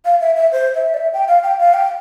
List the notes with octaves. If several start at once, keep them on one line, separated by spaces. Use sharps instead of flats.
F5
E5
E5
C5
E5
D5
E5
G5
F5
G5
F5
G5